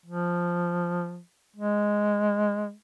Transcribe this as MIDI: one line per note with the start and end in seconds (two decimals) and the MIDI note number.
0.06 1.20 53
1.56 2.73 56